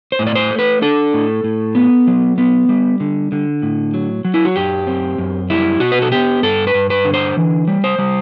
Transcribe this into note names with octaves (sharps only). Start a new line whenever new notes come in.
C5
A2
D5
C5
A3
B4
D4 A4
A2
A2
B3
F#3
B3
G3
D3
D3
A2
F#3
F#3
E4
F#4
F#2 G4
C4
F#2
G3 E4
B2 F#4
B4
A4
B3 G4
G2 A4
B4
G2
B4
D3
C5
E3
G3
C5
G3